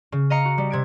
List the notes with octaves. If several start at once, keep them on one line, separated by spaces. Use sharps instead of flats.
C#3
D#5 F5 A#5 C#7
F#4
G3
C3 G#6 D7